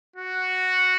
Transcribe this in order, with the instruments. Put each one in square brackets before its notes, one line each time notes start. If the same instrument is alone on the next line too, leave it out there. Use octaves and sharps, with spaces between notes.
[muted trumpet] F#4